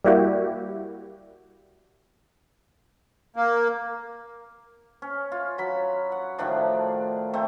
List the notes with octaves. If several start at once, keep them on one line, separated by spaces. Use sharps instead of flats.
G3 A#3 E4 F#4 G4
A#3
C#4
F4
F#3 B5
F#5
A2 D#3 F3 D4
D#3 A3 C4